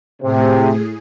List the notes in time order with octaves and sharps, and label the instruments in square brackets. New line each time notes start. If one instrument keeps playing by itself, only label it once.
[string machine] A2 G#4 [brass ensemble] C3